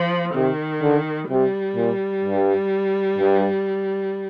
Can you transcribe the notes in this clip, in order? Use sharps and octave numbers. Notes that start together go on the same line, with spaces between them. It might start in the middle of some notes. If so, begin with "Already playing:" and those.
Already playing: F3
C3 D#3
D3
C3 G3
A#2
G2
G2